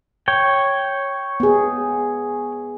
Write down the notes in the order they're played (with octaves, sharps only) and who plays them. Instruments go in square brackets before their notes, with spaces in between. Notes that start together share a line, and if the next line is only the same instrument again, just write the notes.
[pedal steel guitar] C#5 G5
[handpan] B3 G#4